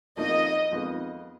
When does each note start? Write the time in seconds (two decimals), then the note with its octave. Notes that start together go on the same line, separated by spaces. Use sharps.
0.17 F2 D#3 A#3 D#4 D#5
0.71 F2 D#3 G#3 B3